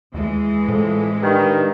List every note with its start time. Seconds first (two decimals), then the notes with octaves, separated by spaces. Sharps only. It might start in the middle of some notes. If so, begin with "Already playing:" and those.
0.14 D#2 E3 G#3
0.68 F2 A2
1.22 G2 D#3